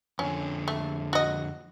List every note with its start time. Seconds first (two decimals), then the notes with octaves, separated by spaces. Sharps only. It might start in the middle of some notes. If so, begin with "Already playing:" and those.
0.19 F2 D3 C#4
0.68 A3
1.13 F#4 D#5